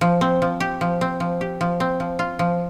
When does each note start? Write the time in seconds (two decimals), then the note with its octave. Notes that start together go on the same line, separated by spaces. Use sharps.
0.01 F3
0.21 C4
0.42 F3
0.60 G4
0.81 F3
1.01 C4
1.20 F3
1.41 G4
1.61 F3
1.80 C4
2.00 F3
2.19 F4
2.39 F3